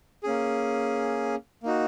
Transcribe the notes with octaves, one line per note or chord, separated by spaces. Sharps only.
A#3 C#4 G#4
A#3 D#4 F#4